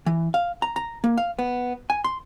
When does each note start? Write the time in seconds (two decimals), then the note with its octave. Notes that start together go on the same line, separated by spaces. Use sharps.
0.06 E3
0.34 F5
0.62 A#5
0.76 A#5
1.04 A#3
1.17 F5
1.39 B3
1.90 G#5
2.04 C6